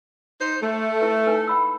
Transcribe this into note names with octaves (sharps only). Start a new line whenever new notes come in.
D#4 C5
A3
E4 B4
D#4 B4 G#5
G5 B5 E6